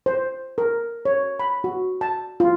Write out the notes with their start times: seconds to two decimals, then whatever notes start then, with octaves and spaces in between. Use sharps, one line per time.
0.06 C5
0.58 A#4
1.05 C#5
1.40 B5
1.64 F#4
2.01 A5
2.40 F4